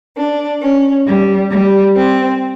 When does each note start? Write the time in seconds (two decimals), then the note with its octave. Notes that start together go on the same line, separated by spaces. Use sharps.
0.16 D4
0.60 C#4
1.06 G3
1.50 G3
1.94 C4